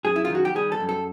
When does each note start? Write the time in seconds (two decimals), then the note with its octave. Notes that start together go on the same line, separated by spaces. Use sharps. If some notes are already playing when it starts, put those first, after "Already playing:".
0.05 F#2 G#4
0.16 E4
0.25 F4
0.30 D#3 F#4
0.45 G4
0.55 G3 G#4
0.72 A4
0.80 F#2
0.89 A4